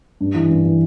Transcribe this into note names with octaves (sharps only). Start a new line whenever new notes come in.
G2
E3
G2
E3